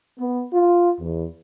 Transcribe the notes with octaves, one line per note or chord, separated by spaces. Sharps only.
B3
F4
E2